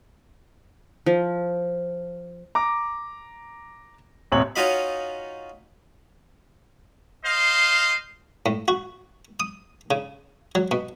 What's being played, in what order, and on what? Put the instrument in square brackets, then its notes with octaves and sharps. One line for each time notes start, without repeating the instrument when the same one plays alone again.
[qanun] F3
[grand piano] A#5 D6
D#1 A1 C3 C#5 F#7
[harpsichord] C#4 D#4 F4 F#4 D#5 B5
[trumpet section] C5 D#5 F5
[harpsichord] A2
F#4
D#6
C#3
F#3
B2